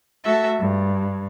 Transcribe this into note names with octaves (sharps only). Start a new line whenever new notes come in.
A3 F#4 A4 E5
G2